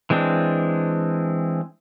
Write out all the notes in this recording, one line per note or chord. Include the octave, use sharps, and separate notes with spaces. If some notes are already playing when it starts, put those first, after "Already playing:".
E3 G#3 C4 D4